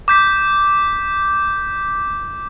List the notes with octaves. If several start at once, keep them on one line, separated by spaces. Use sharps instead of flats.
D6 G6 B6